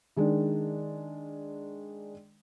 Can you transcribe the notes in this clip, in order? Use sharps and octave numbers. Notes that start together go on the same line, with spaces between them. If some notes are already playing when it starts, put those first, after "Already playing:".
D#3 G#3 D4